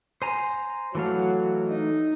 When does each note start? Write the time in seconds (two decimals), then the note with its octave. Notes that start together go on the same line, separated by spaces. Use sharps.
0.22 C5 G#5 A#5
0.95 E3 F#3 A3 F5
1.67 D#4